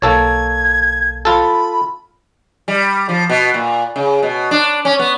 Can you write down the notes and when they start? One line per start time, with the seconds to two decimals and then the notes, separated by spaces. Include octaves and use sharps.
0.02 B1 A#3 A4 C#5 G#6
1.25 F4 A4 B5
2.68 G3
3.09 F3
3.30 B2
3.54 A#2
3.96 C#3
4.23 B2
4.51 D4
4.85 C#4
4.99 B3